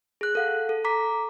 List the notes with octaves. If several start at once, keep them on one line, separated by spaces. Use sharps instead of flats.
G#4 F#6
A4 F5 F#5
A4
A#5 D6 B6